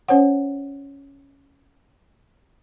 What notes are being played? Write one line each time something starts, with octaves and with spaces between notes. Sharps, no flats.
C#4 C5 C#5 F#5